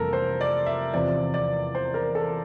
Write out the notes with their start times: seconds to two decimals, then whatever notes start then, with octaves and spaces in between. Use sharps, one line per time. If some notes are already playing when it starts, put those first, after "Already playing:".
Already playing: F1 F2 E3 G3 A#3 A4 A#4
0.13 C5
0.41 D5
0.66 E5
0.93 E2 C3 F3 C4 D5
1.34 D5
1.75 C5
1.94 A#4
2.15 A4